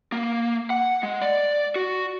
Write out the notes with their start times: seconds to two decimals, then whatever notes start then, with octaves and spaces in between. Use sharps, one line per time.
0.12 A#3
0.70 F#5
1.03 G#3
1.22 D5
1.76 F#4